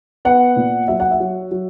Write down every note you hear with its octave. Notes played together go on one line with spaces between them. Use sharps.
B3 F#5
A#2
F#3 E5
F#5
E5
F#3
F#3